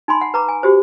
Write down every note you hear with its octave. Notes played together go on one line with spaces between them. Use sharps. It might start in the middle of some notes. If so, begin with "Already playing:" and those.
D#4 G#5 B5 C6
F#5
B4 A#5 D6
G#5
F#4 G4 C5